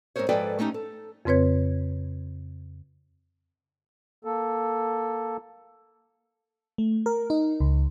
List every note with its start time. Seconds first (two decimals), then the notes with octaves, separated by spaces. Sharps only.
0.16 G#2 C4 A4 A#4 C5 C#5
0.29 G#2 F3 A4 B4 D5 G5
0.59 A3 C#4 D#4 F4 G4
0.74 A4
1.25 F2 C#3 C4 B4 C#5 G#6
4.25 A#3 A4
6.78 A3
7.06 A#4
7.30 D#4
7.60 C#2